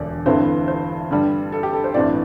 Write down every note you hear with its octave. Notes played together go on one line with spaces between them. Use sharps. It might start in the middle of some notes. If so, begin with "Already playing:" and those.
Already playing: E1 D2 D5
G1 G2 E3 A3 C4 C5
C5
G2 D3 G3
A4
G4
A4
C5
A1 G2 E3 C4 D5